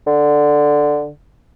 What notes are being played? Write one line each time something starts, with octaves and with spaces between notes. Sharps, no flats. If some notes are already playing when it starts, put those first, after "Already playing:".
D3